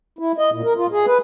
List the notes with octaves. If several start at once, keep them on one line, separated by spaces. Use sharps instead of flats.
E4
D#5
A#2
A#4
F4
G#4
B4